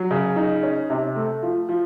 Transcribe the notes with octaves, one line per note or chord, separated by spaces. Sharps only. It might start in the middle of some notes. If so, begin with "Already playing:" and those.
Already playing: F#3
C#3
D#4
C#4
C3
A3
F3
F3